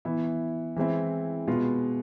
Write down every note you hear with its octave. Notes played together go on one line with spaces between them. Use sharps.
E3 B3 E4
E3 G#3 C4 E4
B2 G#3 B3 F4